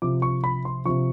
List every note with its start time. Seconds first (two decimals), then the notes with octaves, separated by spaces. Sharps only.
0.02 C3 F3 D6
0.22 C#6
0.44 B5
0.65 C6
0.85 C3 F3 C#6